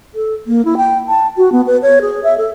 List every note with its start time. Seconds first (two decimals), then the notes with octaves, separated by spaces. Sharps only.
0.15 A4
0.47 A#3
0.65 E4
0.77 G5
1.09 A5
1.37 F#4
1.52 B3
1.67 B4
1.82 C#5
2.01 G#4
2.24 E5
2.38 A4